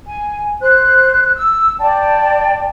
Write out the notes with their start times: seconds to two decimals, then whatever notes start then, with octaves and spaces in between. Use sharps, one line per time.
0.06 G#5
0.61 C5 F#6
1.36 E6
1.79 D5 G5 A5